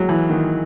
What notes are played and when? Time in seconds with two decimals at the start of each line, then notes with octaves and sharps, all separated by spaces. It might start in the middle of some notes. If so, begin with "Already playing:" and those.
Already playing: F#3 G#3
0.09 E3
0.29 D#3